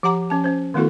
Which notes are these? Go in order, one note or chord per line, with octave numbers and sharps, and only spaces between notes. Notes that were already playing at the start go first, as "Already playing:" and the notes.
F3 G4 F#5 A#5 D6
F3 C#4 A5
C#4 C5
D#3 A3 B3 E4 F#4 A4